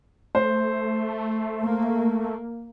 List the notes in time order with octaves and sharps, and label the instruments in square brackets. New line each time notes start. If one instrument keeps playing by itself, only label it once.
[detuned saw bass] A3 [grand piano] C5
[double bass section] A#3